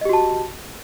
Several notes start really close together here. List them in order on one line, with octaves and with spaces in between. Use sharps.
D#5 G4 F#4 A5